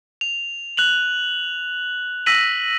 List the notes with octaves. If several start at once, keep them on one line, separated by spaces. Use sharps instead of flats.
F7
F#6 F7 F#7
E6 A#6 B6 D#7 F#7